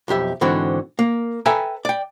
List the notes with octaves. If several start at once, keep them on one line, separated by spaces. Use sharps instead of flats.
B1 F2 G4 E5
G#2 D3 E3 C4 F#4
A#3
A4 B4 E5 G5 G#5 A#5
D5 G5